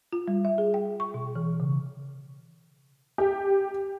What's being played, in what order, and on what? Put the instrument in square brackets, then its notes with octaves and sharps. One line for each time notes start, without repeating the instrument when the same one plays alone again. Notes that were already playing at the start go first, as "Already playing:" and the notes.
[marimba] F4
G3
E5
G#4
G5
C#6
B2
E3
C#3
[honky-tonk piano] G4